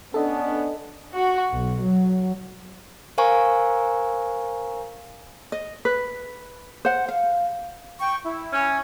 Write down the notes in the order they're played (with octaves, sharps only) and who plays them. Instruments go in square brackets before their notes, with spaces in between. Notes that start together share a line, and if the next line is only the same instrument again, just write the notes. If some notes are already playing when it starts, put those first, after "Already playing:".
[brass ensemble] B3 C#4 D4 [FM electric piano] A4 D#5
[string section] F#4
B1
F#3
[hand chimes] A#4 C5 F5 G#5 A#5 C#6
[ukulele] D#5
B4
C5 F#5
F5
[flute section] G5 C#6
E4
[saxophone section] C#4